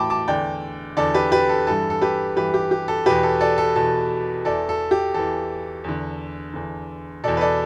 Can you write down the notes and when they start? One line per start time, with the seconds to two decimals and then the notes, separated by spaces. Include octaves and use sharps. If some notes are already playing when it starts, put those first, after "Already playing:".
Already playing: A2 E3 G5 A5 B5 D6
0.10 A5 D6
0.28 E2 D3 D5 G5
0.97 E2 D3 A4 D5
1.14 G4 B4
1.32 G4 B4
1.49 A4
1.67 G2 E3 A4
1.90 A4
2.01 G4 B4
2.36 G2 E3 G4 B4
2.54 G4
2.71 G4
2.88 A4
3.06 E2 B2 G4 B4
3.23 A4
3.41 A4 D5
3.58 A4
3.76 E2 B2 A4
4.45 E2 E3 A4 D5
4.69 A4
4.91 G4
5.14 E2 E3 A4
5.84 E2 D3
6.54 E2 D3
7.24 E2 B2 A4 D5
7.37 B4
7.41 A4 D5